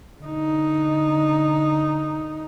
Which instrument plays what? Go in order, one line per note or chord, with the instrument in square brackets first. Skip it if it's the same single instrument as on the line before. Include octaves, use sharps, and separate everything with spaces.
[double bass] D3 D#4